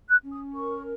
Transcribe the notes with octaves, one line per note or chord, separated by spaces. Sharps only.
F#6
C#4
D#6
A#4 C#6